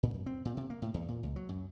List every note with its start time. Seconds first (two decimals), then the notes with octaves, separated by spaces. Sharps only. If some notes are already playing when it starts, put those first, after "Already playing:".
0.03 A#2
0.14 F#2
0.26 C4
0.45 A#2
0.57 C3
0.70 A#3
0.82 A2
0.94 E2
1.08 A#2
1.23 C#2
1.36 F#3
1.49 F#2